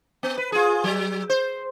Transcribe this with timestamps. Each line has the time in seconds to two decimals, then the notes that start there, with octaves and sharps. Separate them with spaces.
0.23 B3
0.38 B4
0.52 F4 G#4
0.84 F#3
1.30 C5